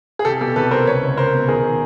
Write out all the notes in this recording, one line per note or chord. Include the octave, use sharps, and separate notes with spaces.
G#4
C2 G4 A4
B2 G4 A4
C2 A4 B4
C2 A#4 C5
C#2 B4 C#5
C#2
C#2 A#4 C5
B2
D#3 G#4 A#4
D#3